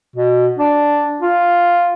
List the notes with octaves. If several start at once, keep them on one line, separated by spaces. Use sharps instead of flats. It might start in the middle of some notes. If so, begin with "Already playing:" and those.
B2
D4
F4